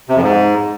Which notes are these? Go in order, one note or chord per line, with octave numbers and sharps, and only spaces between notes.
C3
F2
G#2